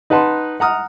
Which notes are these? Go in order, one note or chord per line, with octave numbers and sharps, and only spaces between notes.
D#4 B4 F#5 A5 C6
F#5 A#5 D#6 F6